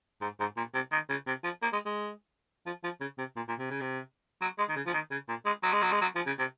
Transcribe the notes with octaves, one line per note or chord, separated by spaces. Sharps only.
G#2
G#2
A#2
C3
D#3
C#3
C3
F3
A#3
G#3
G#3
F3
F3
C#3
C3
A#2
A#2
C3
C#3
C3
F#3
G#3
D#3
C#3
F3
D#3
C#3
A#2
G#3
F#3
G#3
F#3
G#3
F#3
F3
C#3
C3